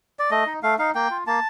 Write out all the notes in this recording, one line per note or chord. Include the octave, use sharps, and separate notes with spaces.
D5
A3 D#5
D#4
A3 F5
D#4 F5
A#3 G5
F4
A#3 A5